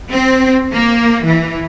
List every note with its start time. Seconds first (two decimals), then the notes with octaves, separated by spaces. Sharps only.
0.12 C4
0.72 A#3
1.24 E3